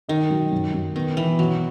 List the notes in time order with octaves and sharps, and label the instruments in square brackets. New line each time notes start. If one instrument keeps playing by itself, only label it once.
[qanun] D#3 [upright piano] D#4
[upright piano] F#3
F#2
F#2
[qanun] D#3 [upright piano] B3
[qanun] E3 [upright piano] B3
[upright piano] B2 [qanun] F#3